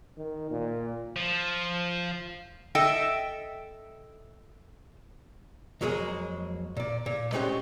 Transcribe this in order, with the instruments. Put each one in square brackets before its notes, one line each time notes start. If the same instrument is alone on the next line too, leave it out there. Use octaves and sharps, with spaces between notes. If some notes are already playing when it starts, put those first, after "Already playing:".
[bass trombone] D#3
A#2
[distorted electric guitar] F3
[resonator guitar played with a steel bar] A4 D#5 E5 G5
[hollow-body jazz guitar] F2 F#3 G#3 A#3 G#4
A#2 D5
A#2
G#3 A3 C4 C#4 G4 F#5